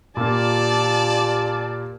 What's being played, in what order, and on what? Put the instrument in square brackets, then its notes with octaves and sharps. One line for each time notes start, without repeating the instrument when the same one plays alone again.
[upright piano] A#2 A#3 [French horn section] F4 G4 [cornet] D5 [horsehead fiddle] A5